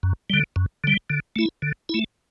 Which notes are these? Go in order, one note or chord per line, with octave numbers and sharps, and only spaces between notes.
F#2
D3 G3
F#2
D3 G3
D3
A3 E4
D3
A3 E4